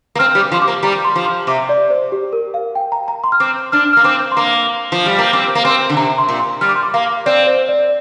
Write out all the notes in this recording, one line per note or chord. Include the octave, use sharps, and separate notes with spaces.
A#3
C4 F6
G3 F6
D6
F3
C6
D6
A#3
G3 A#5
C6
F3
C6
C3 D6
D5
C5
G4
A#4
F5
G5
A#5
A#5
C6
F6
C4 D6
D4 F6
A#3 F6
C4 D6
C6
A#3 D6
F3
G3
A#3
C4 D6
A#3
C4 C6
D3
C3 A#5
C6
A#2
C6
G3 F6
D6
C6
D6
A#3 F5
C4 D5
C5
D5